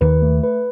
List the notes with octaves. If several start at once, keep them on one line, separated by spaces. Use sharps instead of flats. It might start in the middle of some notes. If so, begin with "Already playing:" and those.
D#2 D#3 B4
A3
B4